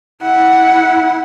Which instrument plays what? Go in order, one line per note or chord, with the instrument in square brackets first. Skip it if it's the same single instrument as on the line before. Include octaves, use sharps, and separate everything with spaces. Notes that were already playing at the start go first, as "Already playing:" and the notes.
[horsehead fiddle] E4 F#5